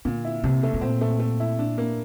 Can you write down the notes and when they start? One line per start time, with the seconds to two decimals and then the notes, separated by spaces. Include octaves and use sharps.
0.05 A#2 D3
0.25 E4
0.44 C2 C3
0.63 A3
0.74 C3
0.81 A#2 C4
1.01 A3
1.20 A3
1.40 E4
1.59 D4
1.78 A#3